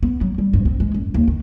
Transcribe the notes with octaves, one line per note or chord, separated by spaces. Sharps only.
B3
F#3
G3
G2
C4
G#3
F#2
D#2
D#3